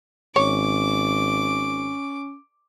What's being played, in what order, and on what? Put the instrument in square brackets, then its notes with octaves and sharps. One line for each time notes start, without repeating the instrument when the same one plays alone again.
[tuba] G#1 [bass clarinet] C#4 [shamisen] C#5 [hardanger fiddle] D6